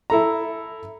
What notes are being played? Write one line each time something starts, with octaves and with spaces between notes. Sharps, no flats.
E4 A4 A#5